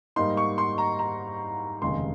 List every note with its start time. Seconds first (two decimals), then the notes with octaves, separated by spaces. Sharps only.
0.16 G#2 G3 A#3 D#4 C6
0.37 C#6
0.58 C6
0.78 A#5
0.99 A#5
1.82 F1 D#2 C#3 G#3 C6